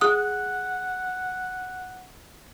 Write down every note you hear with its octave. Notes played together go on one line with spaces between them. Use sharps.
G#4 F#5 D#6